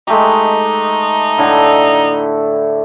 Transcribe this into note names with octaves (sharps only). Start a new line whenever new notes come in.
G#3 A3 D#4 G4
A2 D3 E4